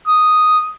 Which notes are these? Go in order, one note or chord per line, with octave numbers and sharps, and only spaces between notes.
D#6